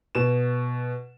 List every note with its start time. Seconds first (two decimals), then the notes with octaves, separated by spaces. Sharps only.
0.15 B2 E7